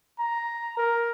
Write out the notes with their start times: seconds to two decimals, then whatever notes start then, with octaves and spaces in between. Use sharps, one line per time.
0.19 A#5
0.77 A#4